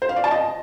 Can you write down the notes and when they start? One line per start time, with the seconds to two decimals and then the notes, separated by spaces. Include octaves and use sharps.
0.02 C5
0.09 F5
0.16 D5
0.24 A5
0.31 D#5